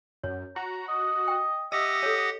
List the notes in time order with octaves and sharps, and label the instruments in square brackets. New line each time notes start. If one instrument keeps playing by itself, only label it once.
[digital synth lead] F#2 [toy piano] C#5
[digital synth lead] F#4 [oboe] A#5
[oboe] D#5
[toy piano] G5
[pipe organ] G4 F#5 A#6 [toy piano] D#5 [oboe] E5 [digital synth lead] D#6
[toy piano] A4 C#5